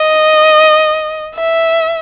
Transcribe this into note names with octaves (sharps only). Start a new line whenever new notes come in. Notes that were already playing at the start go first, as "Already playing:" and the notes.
Already playing: D#5
E5